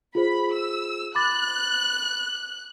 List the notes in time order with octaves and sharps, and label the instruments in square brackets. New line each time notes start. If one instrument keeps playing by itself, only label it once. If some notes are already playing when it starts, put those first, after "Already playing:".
[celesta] F4 G#4 C5 [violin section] B5
[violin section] E6
[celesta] B5 D6 A6 [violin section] F#6